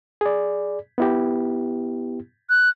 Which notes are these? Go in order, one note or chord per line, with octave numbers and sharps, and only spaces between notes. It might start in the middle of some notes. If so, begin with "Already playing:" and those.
G#4 D5
B3 E4 G4
F#6